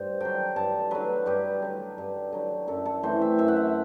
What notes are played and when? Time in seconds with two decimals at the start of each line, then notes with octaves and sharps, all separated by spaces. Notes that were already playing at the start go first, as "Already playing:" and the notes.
Already playing: G2 C5
0.20 D3 F#3 G5
0.56 G2 A5
0.91 D3 F#3 B4
1.26 G2 G4
1.62 D3 F#3
1.98 G2
2.32 D3 F#3
2.68 F#2 A4
2.86 A4
3.03 E3 A3 C4 C5
3.22 E5
3.38 F#2 E5
3.48 F#5
3.56 E5